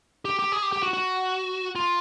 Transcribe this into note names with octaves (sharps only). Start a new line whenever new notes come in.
G4
G4
G#4
G4
G4
F#4
F#4
F4